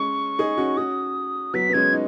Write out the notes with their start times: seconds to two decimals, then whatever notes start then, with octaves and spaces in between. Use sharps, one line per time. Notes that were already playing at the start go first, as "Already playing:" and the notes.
Already playing: G#3 C#4 C#6
0.39 D#4 G#4
0.58 C#4 F#4
0.77 C#4 F#4 D#6
1.54 F#3 B3 B6
1.69 B3
1.73 G#3 C#4 G#6
1.93 D#4